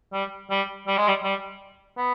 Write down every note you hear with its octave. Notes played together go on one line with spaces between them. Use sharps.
G3
G3
G3
G#3
G3
G3
B3